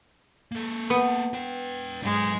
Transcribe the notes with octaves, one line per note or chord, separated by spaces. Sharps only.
A#3 A4
B3
B4 G5
G#2 F#3 G#3 D#4